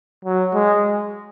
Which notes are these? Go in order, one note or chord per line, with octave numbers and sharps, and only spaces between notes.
F#3
G#3